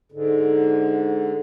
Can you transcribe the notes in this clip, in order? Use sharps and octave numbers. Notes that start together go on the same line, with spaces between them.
G#2 D3